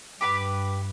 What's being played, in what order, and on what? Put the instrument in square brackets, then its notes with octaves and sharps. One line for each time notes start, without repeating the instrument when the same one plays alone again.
[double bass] G2 [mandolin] G4 B4 B5